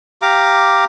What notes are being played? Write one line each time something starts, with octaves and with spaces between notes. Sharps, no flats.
G4 F5 A#5 D6